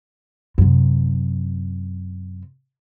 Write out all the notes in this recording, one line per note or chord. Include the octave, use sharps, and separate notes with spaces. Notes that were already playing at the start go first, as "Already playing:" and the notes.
F#2 C3